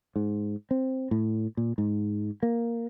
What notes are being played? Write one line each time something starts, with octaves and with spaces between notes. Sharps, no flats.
G#2
C4
A2
A#2
G#2
A#3